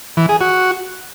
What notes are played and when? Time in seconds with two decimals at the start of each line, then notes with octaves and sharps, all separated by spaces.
0.17 E3
0.29 G#4
0.41 F#4